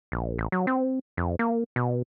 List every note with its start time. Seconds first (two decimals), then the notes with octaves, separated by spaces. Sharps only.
0.12 A#1
0.38 A1
0.52 F#3
0.67 C4
1.17 F2
1.39 A#3
1.76 B2